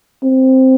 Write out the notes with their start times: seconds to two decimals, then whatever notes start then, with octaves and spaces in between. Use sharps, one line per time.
0.23 C4